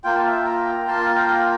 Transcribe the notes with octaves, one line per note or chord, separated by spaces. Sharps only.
A#3 F4 G5
A5
E5 G5
G5 A#5
A#3 F4 A5 C6
G5 A#5